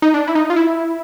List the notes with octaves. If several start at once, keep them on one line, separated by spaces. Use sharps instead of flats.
D#4
D4
E4
D#4
F4
E4